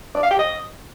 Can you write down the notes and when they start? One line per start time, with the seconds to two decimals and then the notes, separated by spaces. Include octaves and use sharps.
0.15 D5
0.23 F5
0.31 G5
0.39 D#5